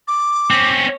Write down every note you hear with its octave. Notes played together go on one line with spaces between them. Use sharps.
D6
C4 C#4